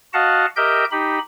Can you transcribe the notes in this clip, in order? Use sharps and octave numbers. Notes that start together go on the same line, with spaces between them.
F#4 D#5 F5 F#5 A5
G4 A#4 D#5 E5 G5 G6
D#4 G4 B5